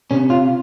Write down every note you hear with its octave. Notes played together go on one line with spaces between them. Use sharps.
C3 C#4
F4